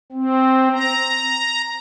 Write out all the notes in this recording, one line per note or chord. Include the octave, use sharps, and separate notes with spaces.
C4
A#5